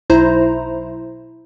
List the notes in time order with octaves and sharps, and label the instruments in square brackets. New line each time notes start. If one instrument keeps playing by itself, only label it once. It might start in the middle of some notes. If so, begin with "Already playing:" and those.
[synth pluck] B1 E4 C5 A#5